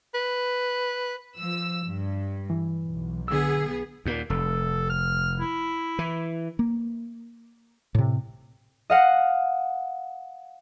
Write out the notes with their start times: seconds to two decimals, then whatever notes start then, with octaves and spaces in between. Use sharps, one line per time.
0.14 B4
1.38 F3 E6
1.88 G2
2.50 E3
2.84 B1
3.28 D3 B3 G#4 E6
4.05 D#2 A#2
4.30 F1 A4
4.90 F6
5.39 E4
5.99 E3
6.59 A#3
7.95 A2 C3
8.90 D#5 F5 F#5